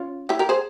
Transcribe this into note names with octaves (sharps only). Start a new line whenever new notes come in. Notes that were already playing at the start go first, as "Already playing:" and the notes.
Already playing: C#4 F4
E4 G4
G4 A#4
G#4 C5